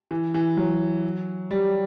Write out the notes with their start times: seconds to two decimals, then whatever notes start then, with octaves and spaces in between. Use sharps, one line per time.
0.11 E3
0.34 E3
0.57 F#3
1.51 G3